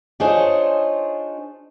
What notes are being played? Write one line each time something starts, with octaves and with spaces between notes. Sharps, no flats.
D4 D#4 F4 G#4 C5 C#5